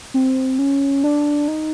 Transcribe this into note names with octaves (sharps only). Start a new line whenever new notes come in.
C4
C#4
D4
D#4